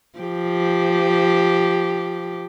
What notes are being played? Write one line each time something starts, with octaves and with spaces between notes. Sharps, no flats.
F3 G4